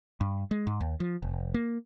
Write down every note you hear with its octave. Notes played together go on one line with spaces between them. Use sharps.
G2
G#3
G#2
D#2
F3
F1
A#3